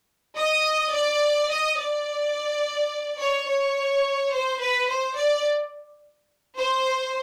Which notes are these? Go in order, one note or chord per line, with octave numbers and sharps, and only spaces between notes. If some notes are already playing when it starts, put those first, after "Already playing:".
D#5
D5
D#5
D5
C#5
C#5
C5
B4
C5
D5
C5